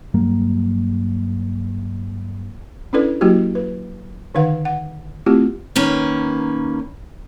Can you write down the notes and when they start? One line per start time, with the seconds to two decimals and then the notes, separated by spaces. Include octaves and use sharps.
0.14 G2 F#3 A#3
2.93 C#4 D4 E4 A4 B4 D5
3.21 F#3 A#3 E4 F#4 G4
3.55 B4
4.35 D3 D#3 D#4 B4 F5 F#5
4.65 F#5
5.26 A3 C4 E4 F4 G4
5.76 D#3 A#3 C#4 B4